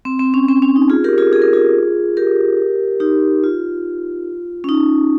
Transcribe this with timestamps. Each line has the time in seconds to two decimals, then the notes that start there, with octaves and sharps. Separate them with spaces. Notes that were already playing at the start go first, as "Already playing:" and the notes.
0.05 C4
0.19 C4
0.34 C#4
0.49 C4
0.62 C#4
0.76 D#4
0.90 F4 G#4
1.04 G4 A#4
1.18 F4 G#4
1.33 G#4
1.42 A#4
1.53 F4 G#4
2.17 G4 A#4
3.00 D#4 G4
3.44 F4
4.64 C#4
4.69 D#4